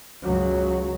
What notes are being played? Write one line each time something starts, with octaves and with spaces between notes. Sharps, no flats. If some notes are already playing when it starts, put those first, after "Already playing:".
C#2 F#3